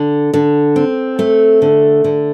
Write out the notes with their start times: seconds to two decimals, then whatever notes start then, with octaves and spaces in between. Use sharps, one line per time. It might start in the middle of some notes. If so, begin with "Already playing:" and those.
Already playing: D3
0.33 D3
0.76 C4
1.19 A3
1.62 D3
2.04 D3